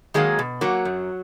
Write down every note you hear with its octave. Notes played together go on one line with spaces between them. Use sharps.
D#3 F#3 G#3 A#3 G#4
B2
F#3 A#3 F#4
F#2